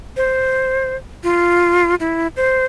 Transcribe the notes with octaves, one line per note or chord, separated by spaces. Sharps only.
C5
F4
E4
C5